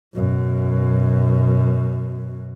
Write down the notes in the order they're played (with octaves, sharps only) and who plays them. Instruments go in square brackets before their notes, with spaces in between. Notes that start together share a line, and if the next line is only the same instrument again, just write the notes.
[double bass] F#2 B2